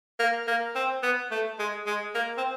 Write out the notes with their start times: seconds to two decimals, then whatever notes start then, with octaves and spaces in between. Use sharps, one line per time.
0.19 A#3
0.48 A#3
0.75 C4
1.03 B3
1.31 A3
1.59 G#3
1.87 G#3
2.15 A#3
2.37 C4